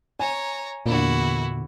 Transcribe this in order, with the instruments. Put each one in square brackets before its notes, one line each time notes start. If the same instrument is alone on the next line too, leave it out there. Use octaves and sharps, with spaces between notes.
[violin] C#5 A#5 [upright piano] G#5
[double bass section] E2 D3 [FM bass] A#2 [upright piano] A#3 D4 [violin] E4 F#4